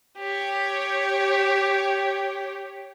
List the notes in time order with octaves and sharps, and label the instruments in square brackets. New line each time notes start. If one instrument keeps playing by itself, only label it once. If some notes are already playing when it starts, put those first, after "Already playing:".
[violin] G4 C#5